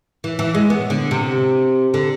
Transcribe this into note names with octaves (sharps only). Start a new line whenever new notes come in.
E3
E3
G#3
B3
D3
C3
D3